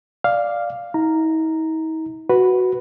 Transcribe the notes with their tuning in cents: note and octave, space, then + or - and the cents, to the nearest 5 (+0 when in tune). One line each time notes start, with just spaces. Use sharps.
D5 +0 F5 +0
D#4 +45 A#5 -5
F#4 +0 B4 +0